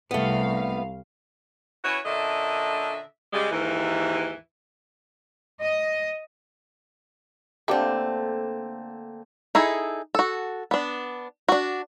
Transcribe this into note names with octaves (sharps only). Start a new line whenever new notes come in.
C2 A3 B3 F5
C#4 E4 F#4 B4 C#5
A#2 D3 C#4 D4 D#5 E5
C#3 G3 G#3
D#2 G#2 E3
D#5
D3 A3 A#3 C4 D4 G4 A4
D#4 E4 G#4 A4
F#4 A4
B3 D4
D4 F#4